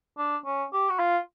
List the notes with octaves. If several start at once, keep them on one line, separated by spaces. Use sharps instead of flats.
D4
C#4
G4
F#4
F4